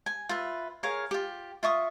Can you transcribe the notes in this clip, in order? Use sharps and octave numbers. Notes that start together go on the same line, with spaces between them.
G#5
F4 B4 E5
G#4 A#4 C#5 F5
F4 G4
F4 E5 C#6 D#6